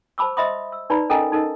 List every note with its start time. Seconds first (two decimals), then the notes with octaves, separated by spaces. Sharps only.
0.18 C5 A5 B5 D6 E6
0.37 C5 D#5 E5 B5 C6 D#6
0.72 E6
0.90 D#4 B4 D5 A#5 B5
1.10 C#4 A4 A#4 D#5 G#5 A#5
1.32 D#4 A4 A#4 D#5